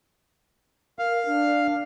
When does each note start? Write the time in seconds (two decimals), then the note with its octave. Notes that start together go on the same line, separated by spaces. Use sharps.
0.99 A#4 F5
1.26 D4